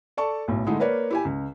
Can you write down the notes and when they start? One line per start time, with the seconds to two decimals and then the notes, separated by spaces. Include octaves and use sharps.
0.17 A4 D5 A5 C#6
0.48 B1 A2
0.66 D3 G#3 A3 D#4 E4
0.80 A#3 A#4 B4 C#5 D5
1.11 E4 G4 G#5
1.25 C#2